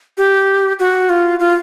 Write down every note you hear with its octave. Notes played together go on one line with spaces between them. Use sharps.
G4
F#4
F4
F4